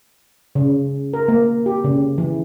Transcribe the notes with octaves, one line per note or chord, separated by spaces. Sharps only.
C#3
A#4
A#3
G4
C#3
E3